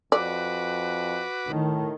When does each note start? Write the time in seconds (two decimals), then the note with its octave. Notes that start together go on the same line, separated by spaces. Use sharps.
0.12 F2 F#4 B4 D5 D6
1.50 A2 D#3